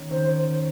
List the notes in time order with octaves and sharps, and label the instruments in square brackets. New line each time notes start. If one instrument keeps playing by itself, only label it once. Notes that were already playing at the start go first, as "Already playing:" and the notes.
Already playing: [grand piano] D#3 C#4
[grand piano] D#3 [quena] C5